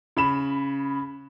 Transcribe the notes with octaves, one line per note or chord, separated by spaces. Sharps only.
C#3 B5 E7